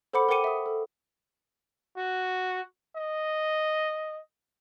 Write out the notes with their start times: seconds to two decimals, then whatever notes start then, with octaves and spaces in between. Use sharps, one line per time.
0.13 A4 C5 F#5 B5 D6 C#7
0.29 A#4 F#5 G5 D6 C#7 D#7
0.44 E5 D#6
0.66 A4
1.97 F#4
2.96 D#5